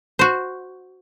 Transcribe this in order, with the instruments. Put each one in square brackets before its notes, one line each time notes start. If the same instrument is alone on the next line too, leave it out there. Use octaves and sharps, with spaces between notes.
[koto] F#4 C5